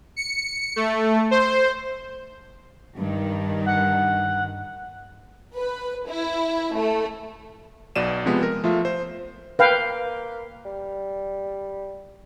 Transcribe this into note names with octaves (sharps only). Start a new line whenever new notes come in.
C#7
A3
C5
G2 D#3
F#5
B4
E4
A3
B1 B2 D5 D#7 E7
C3 F3 G#3 B3
A#4
F3 A3 F4 E5
C5
A#3 B4 F5 G5
G3